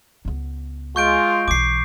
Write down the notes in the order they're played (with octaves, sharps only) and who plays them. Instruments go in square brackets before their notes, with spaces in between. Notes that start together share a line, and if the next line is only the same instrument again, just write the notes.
[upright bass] C#2 B3
[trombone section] G#3 F4 [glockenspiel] C#6 G6 D7
[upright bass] B1 E3 [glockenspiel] D6 C7